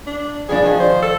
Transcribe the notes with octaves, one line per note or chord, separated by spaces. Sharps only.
D4
G2 F3 D4 G#4
D3 D#3 F3
C5
A4